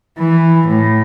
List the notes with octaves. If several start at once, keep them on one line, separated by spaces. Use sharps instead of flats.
E3
A2